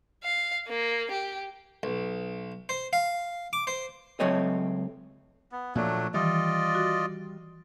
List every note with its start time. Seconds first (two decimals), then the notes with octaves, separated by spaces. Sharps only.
0.24 F5
0.68 A#3
1.11 G4
1.83 B1
2.69 C5
2.93 F5
3.53 D6
3.67 C5
4.20 C#2 F#3 A3 C4 C#5 D#5
5.52 B3
5.75 A#2 F3 F#3 A3 A#3 D4
6.14 D#3 E3 G3 F4 D5 D#5
6.75 F#4